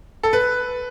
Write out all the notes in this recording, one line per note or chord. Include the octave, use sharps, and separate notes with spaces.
A4
B4